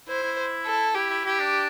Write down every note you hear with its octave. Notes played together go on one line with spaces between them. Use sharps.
E4 C5
E4
A4
E4 G4
E4
E4 G4
D4